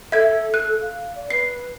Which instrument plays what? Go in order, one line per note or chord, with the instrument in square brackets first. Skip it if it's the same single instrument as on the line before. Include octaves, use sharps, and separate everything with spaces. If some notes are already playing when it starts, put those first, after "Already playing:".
[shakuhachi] A4 [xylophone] E5 G#6
[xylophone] F#6
[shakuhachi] F5
D5
[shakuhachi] B4 [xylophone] C7